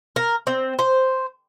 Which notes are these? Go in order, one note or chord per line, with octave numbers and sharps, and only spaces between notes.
A#4
C4
C5